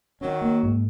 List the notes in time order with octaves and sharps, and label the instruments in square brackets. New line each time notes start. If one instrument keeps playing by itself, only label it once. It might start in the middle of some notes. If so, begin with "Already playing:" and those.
[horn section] D#3 F#3 [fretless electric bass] C#4
[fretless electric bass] A#3
G#2